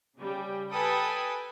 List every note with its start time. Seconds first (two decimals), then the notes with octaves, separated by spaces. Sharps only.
0.20 C#3 G3
0.71 A4 B4 G5 G#5 B5 D#6